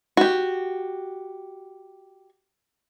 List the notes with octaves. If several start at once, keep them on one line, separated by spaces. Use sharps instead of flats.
F#4 G4